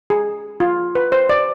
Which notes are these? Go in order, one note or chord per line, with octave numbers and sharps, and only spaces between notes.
G#4
F4
B4
C5
D5